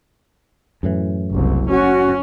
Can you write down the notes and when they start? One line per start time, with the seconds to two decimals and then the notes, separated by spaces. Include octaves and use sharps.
0.83 F#2 A2 E3
1.31 F#1 C2
1.70 C#4 F#4